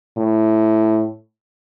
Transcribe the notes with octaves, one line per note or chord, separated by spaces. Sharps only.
A2